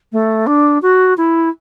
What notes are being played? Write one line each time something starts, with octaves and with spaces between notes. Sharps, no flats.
A3
D4
F#4
E4